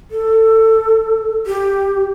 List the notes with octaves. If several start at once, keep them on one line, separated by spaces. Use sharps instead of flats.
A4
G4